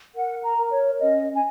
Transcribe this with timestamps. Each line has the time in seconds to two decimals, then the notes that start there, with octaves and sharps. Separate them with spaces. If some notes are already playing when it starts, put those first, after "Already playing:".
0.15 A#4 F#5
0.43 A#5
0.57 A#4
0.71 C#5
0.99 C#4 D#5
1.34 G#5